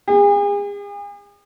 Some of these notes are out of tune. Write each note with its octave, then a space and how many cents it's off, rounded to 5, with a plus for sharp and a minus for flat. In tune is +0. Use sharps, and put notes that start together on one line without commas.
G#4 -40